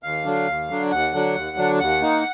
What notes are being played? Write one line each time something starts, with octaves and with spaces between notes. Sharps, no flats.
D#2 F5
D3 F#3 D4
D#2
D3 F#3 D4
D#2 F#5
D3 F#3 D4
D#2
D3 F#3 D4
D#2 F#5
D#3 A#3 D#4